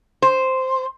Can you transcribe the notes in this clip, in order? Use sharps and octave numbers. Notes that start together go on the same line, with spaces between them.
C5